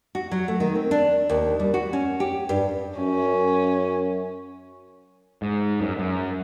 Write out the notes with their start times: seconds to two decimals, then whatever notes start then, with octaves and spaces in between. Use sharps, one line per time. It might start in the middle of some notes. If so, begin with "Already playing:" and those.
0.15 F#4
0.32 F#3
0.48 A3
0.60 D#3
0.75 C4
0.91 D4
1.30 D#2
1.60 G3
1.74 F#4
1.93 C#4
2.20 G4
2.49 G2
2.99 F#2 C#4
5.42 G#2
5.81 F#2
5.99 F#2